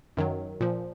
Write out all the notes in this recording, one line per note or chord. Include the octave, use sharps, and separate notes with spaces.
F#2 D#3 F#3
A#2 F3